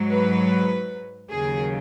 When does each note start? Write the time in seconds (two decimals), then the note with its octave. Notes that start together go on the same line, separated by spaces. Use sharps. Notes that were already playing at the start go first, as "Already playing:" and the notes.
Already playing: G#2 F#3
0.12 B4
1.31 D#2 C#3 F#3 G#4